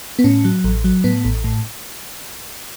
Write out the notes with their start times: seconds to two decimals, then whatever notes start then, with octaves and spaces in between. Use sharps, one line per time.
0.19 B3
0.24 A2 C#4
0.45 F#3
0.64 A1
0.84 F#3
1.04 A2 B3
1.25 A1
1.44 A2